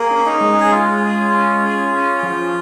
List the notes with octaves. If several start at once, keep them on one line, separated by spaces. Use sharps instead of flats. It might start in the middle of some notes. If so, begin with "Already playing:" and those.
Already playing: A#3 G#4
C#4
D#4
G#3
G#4
G#3 F4
G#4
C#4
G#4
C#4
F3